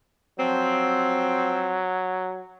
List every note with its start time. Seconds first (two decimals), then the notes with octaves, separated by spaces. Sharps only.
0.39 F3 F#3 C4